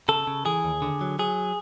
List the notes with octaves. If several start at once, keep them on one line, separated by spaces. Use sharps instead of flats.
C#3 A4
C#3
E3 G#4
D#2
D3
F#3
F#3 G#4